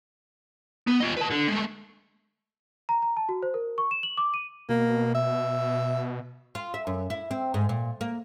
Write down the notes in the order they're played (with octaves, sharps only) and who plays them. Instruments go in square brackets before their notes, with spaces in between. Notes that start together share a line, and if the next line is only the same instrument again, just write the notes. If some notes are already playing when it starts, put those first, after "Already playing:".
[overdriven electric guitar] B3
F4 D#5
B4 A5
D3
G#3 A3
[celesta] A#5
A#5
A5
F#4
C5
A#4
C#6
E7
F#7
D6
D#7
[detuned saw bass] B2 [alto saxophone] A#3
[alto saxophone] E5
[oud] F4
E5
F#2
E4
C4
G#2
A#2
A#3